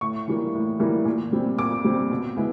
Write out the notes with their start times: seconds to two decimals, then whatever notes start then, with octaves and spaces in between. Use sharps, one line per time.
0.01 A2 C#6
0.28 E3 G3 A#3
0.54 A2
0.79 E3 G3 A#3
1.05 A#2
1.33 G3 C4
1.58 A#2 D6
1.84 G3 C4
2.11 B2
2.36 G#3 B3 E4